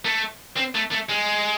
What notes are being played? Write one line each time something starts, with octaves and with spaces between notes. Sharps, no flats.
A3
C4
A3
A3
G#3